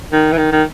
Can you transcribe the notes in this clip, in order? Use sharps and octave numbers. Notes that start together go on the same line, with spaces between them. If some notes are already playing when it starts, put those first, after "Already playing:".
D#3
E3
D#3
D#3